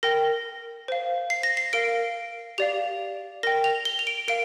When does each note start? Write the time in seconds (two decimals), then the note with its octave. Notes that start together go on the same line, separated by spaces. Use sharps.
0.03 A#4 G5 A#6
0.88 C5 F5
1.30 C7
1.43 A#6
1.57 C7
1.73 A#4 F5 D7
2.58 G4 D5 F5 F7
3.43 A#4 G5 A#6
3.64 F7
3.85 G7
3.99 F7
4.07 D7
4.28 A#4 F5 D7